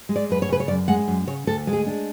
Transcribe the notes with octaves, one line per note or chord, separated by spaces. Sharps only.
G#3
D5
F#2 B4
C#5
C#3 B4
C#5
F#2 D5
G#3 F#5
F#2
C#3 C#5
D2 A4
G#3
G#4
D4